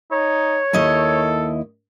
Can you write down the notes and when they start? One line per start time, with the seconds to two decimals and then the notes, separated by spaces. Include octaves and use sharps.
0.12 D#4 C#5
0.73 D#2 E4 A4 D#5